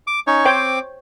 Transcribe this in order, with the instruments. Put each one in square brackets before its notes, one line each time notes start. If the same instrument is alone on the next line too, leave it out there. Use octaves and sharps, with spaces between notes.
[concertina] D6
C#4 D#4 C#5
[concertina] C4 D6 [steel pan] C5 C#5 G5